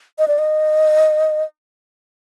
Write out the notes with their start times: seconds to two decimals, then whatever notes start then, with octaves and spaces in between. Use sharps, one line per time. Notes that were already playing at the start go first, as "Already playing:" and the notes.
0.19 D#5
0.28 D5
0.38 D#5